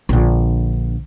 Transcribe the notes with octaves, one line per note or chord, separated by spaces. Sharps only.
A#1 D3